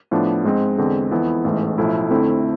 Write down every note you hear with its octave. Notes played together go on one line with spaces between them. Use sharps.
A2 F3 B3 D4
G#2 G#3 C4
E2 D3 G#3 C4
F2 E3 B3 E4
A1 G#2 E3 A3
B1 A2 F3 A3 E4
F2 D3 A3 C4 E4